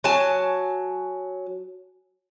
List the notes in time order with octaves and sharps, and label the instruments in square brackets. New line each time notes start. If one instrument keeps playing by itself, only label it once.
[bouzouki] F#3 G#5 A5